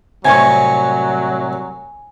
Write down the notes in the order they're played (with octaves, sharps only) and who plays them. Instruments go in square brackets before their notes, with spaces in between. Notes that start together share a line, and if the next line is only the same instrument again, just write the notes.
[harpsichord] C2 A2 C3 [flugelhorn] F#3 [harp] G#5 C#6